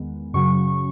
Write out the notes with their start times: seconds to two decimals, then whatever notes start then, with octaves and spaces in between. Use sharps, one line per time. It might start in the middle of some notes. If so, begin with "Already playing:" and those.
Already playing: E2 D#3 G#3 B3
0.34 F#2 C#3 F#3 C#6